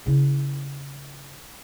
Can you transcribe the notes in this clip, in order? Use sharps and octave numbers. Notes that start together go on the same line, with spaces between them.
C#3 E4